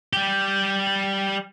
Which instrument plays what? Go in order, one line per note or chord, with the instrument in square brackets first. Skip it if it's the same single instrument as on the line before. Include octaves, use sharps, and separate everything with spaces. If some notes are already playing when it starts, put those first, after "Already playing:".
[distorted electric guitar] G3 G4